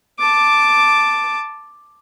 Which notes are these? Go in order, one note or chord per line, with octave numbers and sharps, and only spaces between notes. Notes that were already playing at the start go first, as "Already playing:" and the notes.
A5 D6